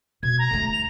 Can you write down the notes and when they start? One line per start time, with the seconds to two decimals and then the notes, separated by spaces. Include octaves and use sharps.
0.23 B2 G#6
0.39 A#5
0.51 D2 A3
0.72 F7